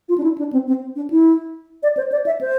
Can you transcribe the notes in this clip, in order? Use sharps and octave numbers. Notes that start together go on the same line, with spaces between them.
F4
D4
E4
D4
C4
C4
D4
E4
D5
C5
D5
E5
C5